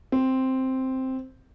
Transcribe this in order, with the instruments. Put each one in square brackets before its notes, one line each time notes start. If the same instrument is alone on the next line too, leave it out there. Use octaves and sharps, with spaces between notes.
[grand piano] C4